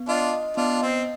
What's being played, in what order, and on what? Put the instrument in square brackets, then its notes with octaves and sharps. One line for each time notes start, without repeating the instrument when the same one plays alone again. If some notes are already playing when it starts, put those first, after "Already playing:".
Already playing: [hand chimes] B3
[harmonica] D4 F4 [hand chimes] D#5
[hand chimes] D#5
[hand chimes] B3 [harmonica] D4 F4
[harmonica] C4 [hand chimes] D#5